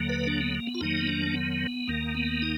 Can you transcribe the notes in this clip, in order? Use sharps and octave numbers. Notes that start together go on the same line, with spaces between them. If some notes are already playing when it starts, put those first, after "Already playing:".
Already playing: D#2 D3 F#3 A#3
B4
D4
B3
A#3
B3
F4
F2 D#3 F#3 A#3 D#4
B3
D4
A#3
B3
D#2 D#3 A#3
B3
D#4